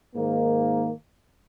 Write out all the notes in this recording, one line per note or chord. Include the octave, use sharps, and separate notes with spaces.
G#2 D#3 A#3